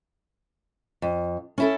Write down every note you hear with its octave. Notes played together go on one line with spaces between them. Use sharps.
F2
C#4 E4 A4